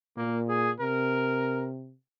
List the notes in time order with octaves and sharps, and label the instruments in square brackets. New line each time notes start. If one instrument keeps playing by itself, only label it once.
[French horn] A#2 [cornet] A#3
[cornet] G#4
[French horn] C3 [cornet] A#4